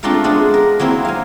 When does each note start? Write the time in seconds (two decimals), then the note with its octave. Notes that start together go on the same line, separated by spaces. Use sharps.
0.03 A3 C4 D4 F4 A#4 F5
0.24 G#3 B3 D4
0.54 A#4
0.80 F#3 A#3 C4 E4
1.05 F5 G#5